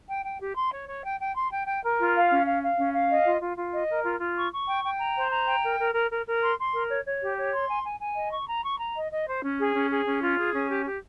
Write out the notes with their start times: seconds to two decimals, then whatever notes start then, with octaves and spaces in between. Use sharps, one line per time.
0.09 G5
0.24 G5
0.41 G4
0.56 C6
0.72 C#5
0.89 C#5
1.03 G5
1.20 G5
1.35 C6
1.52 G5
1.67 G5
1.84 A#4
1.99 F4
2.15 F5
2.30 C#4
2.46 F5
2.62 F5
2.78 C#4
2.94 F5
3.10 D#5
3.26 F4
3.41 F4
3.57 F4
3.73 D#5
3.88 A#4
4.04 F4
4.21 F4
4.36 C#6
4.52 C#6
4.68 G5
4.84 G5
4.99 A#5
5.16 C5
5.31 A#5
5.48 G5
5.63 A#4
5.79 A#4
5.94 A#4
6.11 A#4
6.27 A#4
6.42 C6
6.58 C6
6.73 A#4
6.89 C#5
7.06 C#5
7.21 G4
7.37 C#5
7.53 C6
7.69 G#5
7.85 G#5
8.00 G#5
8.15 D#5
8.31 C#6
8.47 A#5
8.64 C#6
8.79 A#5
8.95 D#5
9.12 D#5
9.26 C5
9.42 C#4
9.59 G#4
9.74 C#4
9.90 G#4
10.06 C#4
10.21 F4
10.38 G#4
10.54 C#4
10.70 G4
10.85 G4